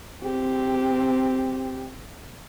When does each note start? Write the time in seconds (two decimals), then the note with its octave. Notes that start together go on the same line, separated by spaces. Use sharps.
0.22 C4 G4